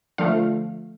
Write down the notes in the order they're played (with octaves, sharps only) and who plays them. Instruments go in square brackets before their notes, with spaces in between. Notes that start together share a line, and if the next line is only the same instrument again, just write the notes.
[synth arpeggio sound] D3 F3 A3 F5